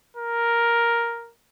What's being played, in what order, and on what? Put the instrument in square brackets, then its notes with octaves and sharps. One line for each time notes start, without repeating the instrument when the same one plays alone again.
[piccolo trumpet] A#4